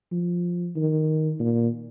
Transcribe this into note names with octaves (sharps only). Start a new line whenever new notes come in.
F3
D#3
A#2